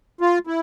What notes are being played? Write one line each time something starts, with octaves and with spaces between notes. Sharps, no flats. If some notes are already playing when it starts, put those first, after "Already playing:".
F4
E4